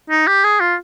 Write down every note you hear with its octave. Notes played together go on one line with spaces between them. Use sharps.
D#4
G4
G#4
F4